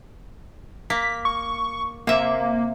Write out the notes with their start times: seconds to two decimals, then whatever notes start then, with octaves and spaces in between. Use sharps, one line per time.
0.90 A#3 B6
1.25 C#6
2.07 C3 A#3 E5